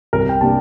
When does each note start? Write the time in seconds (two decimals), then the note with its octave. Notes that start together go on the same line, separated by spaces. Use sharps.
0.13 C2 A#4
0.29 G5
0.41 C3 G3 A#3 D4 A5